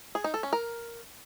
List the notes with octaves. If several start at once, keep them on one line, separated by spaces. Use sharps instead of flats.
G#4
D#4
A4
C#4
A#4